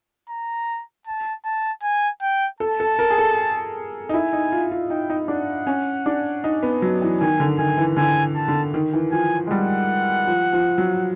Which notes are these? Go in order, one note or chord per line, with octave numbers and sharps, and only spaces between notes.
A#5
A5
A5
G#5
G5
A4 A5
A4
A#4
G#4
A4
D#4
E4 G#5
D#4
F4
F4
D#4 G5
D#4
D4 F#5
C#4
D4
D#4
B3
F#3
E3
D#3 G#5
D3
D#3 G#5
E3
D3 G#5
A5
D3
D#3
E3
F3 G#5
G#3
G3 F#5
F3
F3
F#3